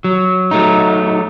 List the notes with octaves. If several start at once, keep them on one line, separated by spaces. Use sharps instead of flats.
F#3
F#3 A3 D#4